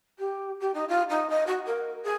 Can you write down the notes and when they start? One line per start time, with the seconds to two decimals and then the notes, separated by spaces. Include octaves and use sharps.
0.18 G4
0.60 G4
0.73 D#4
0.88 F4
1.09 D#4
1.29 D#5
1.46 F#4
1.65 A#4
2.03 G#4